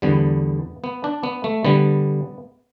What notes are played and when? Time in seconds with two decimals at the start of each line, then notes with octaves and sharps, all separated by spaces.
0.02 E2 D3 G3 B3
0.84 B3
1.04 D4
1.23 B3
1.44 A3
1.64 D3 G3 B3